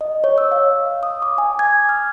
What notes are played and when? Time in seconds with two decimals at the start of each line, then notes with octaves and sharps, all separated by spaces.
0.01 D#5
0.24 C#5
0.38 E6
0.51 F5
1.03 D#6
1.22 D6
1.38 G#5
1.59 G#6
1.89 F6